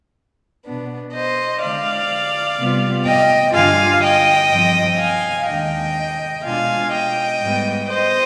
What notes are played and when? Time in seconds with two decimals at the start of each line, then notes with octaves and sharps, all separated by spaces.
0.65 B2 B3 D4
1.13 C5 D#5
1.61 D3 G#3 D4 D5 F5
2.59 C3 G3 B3 F4
3.06 D#5 G5
3.54 G2 D3 G3 D4 F4 F5 G#5
4.02 D#5 G5
4.50 G2 F3 C4
4.99 F5 G#5
5.47 D#2 D#3 G#3 D4 D#5 G5
6.43 B2 G#3 D4 F4 F5 G#5
6.91 D#5 G5
7.41 G#2 G3 B3
7.88 C5 D#5